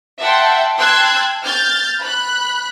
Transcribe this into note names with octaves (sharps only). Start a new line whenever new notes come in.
E5 F#5 G5 A5 C6
G5 A5 C6 E6 F#6 G#6
F6 G6 A6
B5 F#6